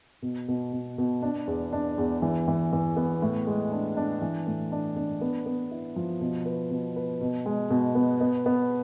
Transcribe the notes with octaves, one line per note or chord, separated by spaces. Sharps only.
B2
B2
B2
B2
D4
E2
D4
E2
E3
E3
E3
B3
A2
G#3
D4
D4
E3
A2
D4
D4
B3
B3
E4
F3
B2
B4
B2
B4
B2
G#3
B2
B3
B3
B3